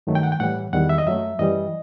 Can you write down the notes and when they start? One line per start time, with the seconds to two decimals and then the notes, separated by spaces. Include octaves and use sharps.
0.07 G2 D#3 F#3 A3
0.15 G5
0.23 F#5
0.32 G5
0.40 A2 E3 G3 F#5
0.73 E2 D#3 G3 F#5
0.89 E5
0.98 D#5
1.06 F#2 F#3 A3 E5
1.39 F#2 E3 G3 D#5